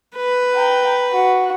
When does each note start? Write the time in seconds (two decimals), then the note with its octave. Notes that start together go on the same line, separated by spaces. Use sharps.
0.17 B4
0.55 G5 A#5
1.11 F#4